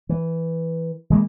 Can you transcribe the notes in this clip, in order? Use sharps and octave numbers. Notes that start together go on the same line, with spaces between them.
E3
E3 G#3 A#3